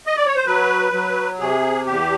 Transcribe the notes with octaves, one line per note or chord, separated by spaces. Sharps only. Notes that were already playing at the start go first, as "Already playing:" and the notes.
D#5
D5
C#5
C5
F#3 B4
F#3
C3 G#4
E2 G4